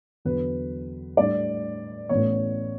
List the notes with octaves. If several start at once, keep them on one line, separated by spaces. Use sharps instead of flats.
E2 D3 F#3 B4
A2 G3 D4 D5
A1 A2 E3 B3 C#5